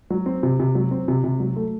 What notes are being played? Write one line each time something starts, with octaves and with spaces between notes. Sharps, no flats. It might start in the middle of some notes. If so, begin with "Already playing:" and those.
F#3
C4
C3
C3
F#3
C4
C3
C3
F#3
A3